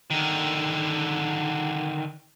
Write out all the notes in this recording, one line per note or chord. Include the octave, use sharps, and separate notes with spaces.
D3 D#3